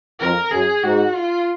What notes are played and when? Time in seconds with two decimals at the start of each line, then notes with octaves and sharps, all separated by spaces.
0.20 F2 A#4
0.51 F#2 G#4
0.83 G#2 F#4
1.15 F4